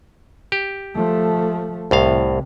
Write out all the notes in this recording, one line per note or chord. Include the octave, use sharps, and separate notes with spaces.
G4
F3 A3
C2 A2 C3 F5